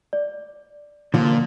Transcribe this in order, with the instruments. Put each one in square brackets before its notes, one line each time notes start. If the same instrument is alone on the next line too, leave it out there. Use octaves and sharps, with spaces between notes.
[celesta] D5
[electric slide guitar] A#2 [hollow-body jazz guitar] D3 F3